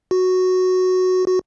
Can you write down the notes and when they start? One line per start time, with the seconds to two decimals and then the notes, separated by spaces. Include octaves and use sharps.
0.11 F#4
1.28 F#4